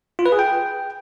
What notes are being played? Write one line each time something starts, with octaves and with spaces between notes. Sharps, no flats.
F4
B4
G#4
G5